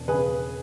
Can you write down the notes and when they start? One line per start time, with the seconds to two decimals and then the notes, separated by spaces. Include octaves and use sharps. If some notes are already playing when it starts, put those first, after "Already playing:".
Already playing: E1
0.08 C#3 G#4 B4